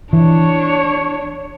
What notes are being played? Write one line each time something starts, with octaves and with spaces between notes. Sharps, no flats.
E3 D4 C#5